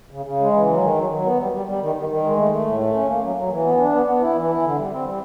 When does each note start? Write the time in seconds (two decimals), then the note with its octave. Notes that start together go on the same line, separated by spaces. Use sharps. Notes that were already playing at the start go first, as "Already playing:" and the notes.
0.11 C#3
0.26 C#3
0.40 G#3
0.53 E3
0.68 F#3
0.81 D#3
0.96 F#3
1.10 F#3
1.24 B3
1.39 G3
1.52 G3
1.66 G3
1.81 D#3
1.95 D#3
2.09 D#3
2.23 G#3
2.37 A3
2.52 A3
2.65 A2
2.79 A3
2.93 C#4
3.07 A#3
3.21 F#3
3.36 F#3
3.50 E3
3.63 B3
3.77 D4
3.92 B3
4.05 B3
4.20 E4
4.34 E3
4.48 E4
4.63 D3
4.77 G3
4.91 C4
5.05 G3